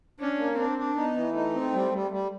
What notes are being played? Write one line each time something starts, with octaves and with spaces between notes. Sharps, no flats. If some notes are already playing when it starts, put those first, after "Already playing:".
C#4 D4
A#3
C4 D4
D4
B3 D#4
E3
A3 D#4
C4
G3
G3
G3